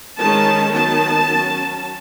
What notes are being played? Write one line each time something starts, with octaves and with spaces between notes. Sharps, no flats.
D#3 G#3 C#4 A5
D#3 F#3 B3 A5
F#3 C#4